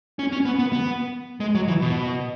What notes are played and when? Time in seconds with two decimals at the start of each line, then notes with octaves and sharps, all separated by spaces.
0.19 C#4
0.32 C#4
0.45 B3
0.59 B3
0.73 B3
1.40 G#3
1.55 F#3
1.68 E3
1.82 B2